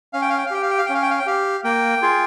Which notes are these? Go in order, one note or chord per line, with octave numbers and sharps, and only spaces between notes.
C#4 F5
G5
F5
G5
F5
G4 G5
F5
G5
F5
G5
C#4
F5
G5
F5
G5
G4 F5
A#3 G5
F4 G#4